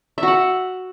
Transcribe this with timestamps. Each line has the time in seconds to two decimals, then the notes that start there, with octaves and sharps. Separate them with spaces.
0.18 E5
0.23 F#4
0.28 F#5